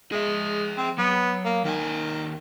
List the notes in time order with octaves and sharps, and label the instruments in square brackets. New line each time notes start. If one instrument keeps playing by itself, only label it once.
[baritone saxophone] G#3 [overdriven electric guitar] G#4 E5
[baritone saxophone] C4
[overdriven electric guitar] F#3 [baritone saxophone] B3
[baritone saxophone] A#3
[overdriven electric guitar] D#2 G#5 [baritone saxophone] D#3